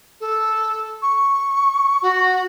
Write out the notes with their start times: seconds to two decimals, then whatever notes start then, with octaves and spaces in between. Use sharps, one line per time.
0.20 A4
1.02 C#6
2.02 F#4